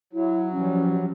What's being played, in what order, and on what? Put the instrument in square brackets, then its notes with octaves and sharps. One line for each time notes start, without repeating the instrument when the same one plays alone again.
[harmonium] F#3 [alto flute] E4
[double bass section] E3 F3 G3 [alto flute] C#4